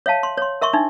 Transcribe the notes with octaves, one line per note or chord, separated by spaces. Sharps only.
C#5 E5 F5 A5
C6
C#5 C6
A#4 E5 C6 C#6
D4 D#4 E5